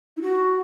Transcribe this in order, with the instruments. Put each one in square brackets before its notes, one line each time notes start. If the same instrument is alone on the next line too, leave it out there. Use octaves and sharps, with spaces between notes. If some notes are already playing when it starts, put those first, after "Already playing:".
[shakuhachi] E4
F#4